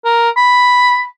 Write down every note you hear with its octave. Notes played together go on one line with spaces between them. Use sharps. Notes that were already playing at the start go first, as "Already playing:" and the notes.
A#4
B5